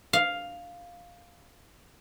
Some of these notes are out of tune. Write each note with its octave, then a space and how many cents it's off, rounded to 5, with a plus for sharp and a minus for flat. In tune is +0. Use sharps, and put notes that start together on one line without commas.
F5 +5